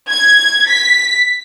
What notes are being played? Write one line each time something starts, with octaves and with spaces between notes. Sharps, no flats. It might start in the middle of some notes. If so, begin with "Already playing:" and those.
G#6
B6